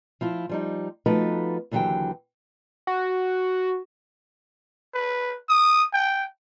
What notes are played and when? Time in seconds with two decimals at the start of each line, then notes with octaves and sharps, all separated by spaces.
0.21 F3 E4 F4
0.49 F3 G3 D#4
1.06 F3 A3 B3 D#4 F#4 B4
1.71 D#2 D3 E3 F#3 G4 G5
2.87 F#4
4.94 B4
5.49 D#6
5.93 G5